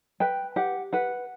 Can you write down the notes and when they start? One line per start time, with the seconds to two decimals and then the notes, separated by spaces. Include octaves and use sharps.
0.20 B4 G5
0.56 G4 F#5
0.93 B4 F#5